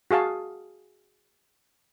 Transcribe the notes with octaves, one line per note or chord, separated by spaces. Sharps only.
F#4 G#4 F5 A5